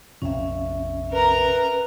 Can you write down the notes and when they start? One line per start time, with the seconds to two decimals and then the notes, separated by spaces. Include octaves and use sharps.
0.22 A#1 F2 C3 C#4 E5
1.12 A#4 B4 A#5